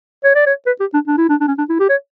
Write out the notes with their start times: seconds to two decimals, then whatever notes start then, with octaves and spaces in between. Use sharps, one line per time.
0.24 C#5
0.35 D5
0.47 C#5
0.67 B4
0.80 G4
0.94 D4
1.07 D4
1.18 E4
1.29 D4
1.41 D4
1.48 C#4
1.58 D4
1.70 E4
1.80 G4
1.89 C#5